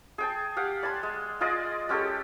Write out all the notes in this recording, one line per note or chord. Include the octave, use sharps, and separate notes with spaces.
G#4 G5 A5
G4 F5 F#5
D5 G#5 A5 C6
G#3
F4 G#4 D5 D#5
G#3 C#4 G4 A4